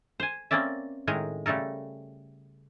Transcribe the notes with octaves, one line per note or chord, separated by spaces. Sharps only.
C5 G#5
A#3 C4 C#4 D5 E5
A2 D#3 G#3 A#4
C#3 G3 A3 A4 A#4